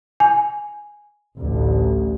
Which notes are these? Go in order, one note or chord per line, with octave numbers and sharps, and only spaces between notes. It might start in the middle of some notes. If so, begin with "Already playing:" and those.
G#5
A1 D2